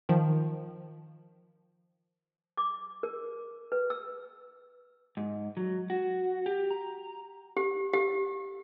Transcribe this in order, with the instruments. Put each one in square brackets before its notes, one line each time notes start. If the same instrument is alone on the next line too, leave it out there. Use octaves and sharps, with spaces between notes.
[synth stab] D#3 F3
[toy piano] D6
A#4
B4
E6
[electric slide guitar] G#2
F#3
F#4
G4
A#5
[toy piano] G4
G4